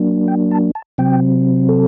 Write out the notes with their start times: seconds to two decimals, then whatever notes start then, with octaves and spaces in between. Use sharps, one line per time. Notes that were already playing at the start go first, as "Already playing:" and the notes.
Already playing: F#3 A#3 D4
0.28 G5
0.51 A5
0.75 A5
0.98 C3 F#3 C4 G5
1.69 A4